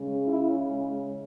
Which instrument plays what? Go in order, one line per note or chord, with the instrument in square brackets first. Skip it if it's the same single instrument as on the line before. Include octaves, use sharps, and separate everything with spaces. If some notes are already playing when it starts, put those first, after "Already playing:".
Already playing: [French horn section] C#3 G#3 C#4
E4